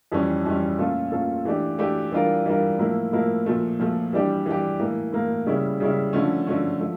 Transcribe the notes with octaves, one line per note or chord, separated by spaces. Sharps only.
F2 E3 G3 C#4
F2 E3 G3 C#4
A#2 A3 C#4 F4 A4
A#2 A3 C#4 F4 A4
E3 A3 D4 G4
E3 A3 D4 G4
E3 G3 D4 F4 A#4
E3 G3 D4 F4 A#4
A2 F3 A#3 E4
A2 F3 A#3 E4
A#2 F3 A3
A#2 F3 A3
E3 G3 D4 G4
E3 G3 D4 G4
A2 E3 A#3
A2 E3 A#3
C#3 G3 C#4 E4
C#3 G3 C#4 E4
D3 F3 A3 C#4
D3 F3 A3 C#4
F3 A3